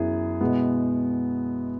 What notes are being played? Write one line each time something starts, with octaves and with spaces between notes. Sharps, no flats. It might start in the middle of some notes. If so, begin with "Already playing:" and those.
Already playing: F#2 E3 B3 E4 G#4
B2 G#3 B3